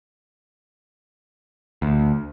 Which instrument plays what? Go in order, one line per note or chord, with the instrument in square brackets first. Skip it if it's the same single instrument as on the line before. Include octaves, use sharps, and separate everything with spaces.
[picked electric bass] D2